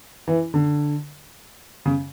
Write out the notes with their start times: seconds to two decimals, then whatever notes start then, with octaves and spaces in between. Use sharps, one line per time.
0.28 E3
0.54 D3
1.86 C#3